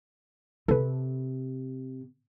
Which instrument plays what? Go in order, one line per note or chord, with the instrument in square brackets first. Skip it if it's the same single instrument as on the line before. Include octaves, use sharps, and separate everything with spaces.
[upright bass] C3 [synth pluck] A4 B4